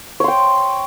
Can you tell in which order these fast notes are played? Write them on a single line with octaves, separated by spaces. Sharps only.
C#5 C6 G5